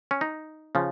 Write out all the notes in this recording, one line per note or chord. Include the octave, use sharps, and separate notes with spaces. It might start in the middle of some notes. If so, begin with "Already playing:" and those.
C#4
D#4
C#3 F3